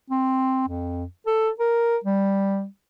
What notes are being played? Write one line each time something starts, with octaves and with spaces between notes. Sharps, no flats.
C4
F2
A4
A#4
G3